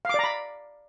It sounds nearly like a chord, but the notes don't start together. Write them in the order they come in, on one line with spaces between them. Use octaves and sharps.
F5 D6 D5 A#5 B5